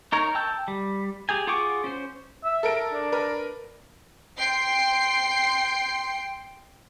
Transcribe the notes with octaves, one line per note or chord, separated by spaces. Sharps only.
D#4 A#4 C#5
G5 A5 E6 G6
G3
G4 G#4 G#5
F4 G#4 F#5 C#6 D6
C#4 C5
E5
A4 A#4 D7
D4
A#4 B4
G5 C6 C7